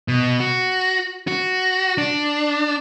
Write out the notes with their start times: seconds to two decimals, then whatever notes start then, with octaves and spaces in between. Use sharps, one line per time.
0.08 B2
0.40 F#4
1.27 F#4
1.98 D4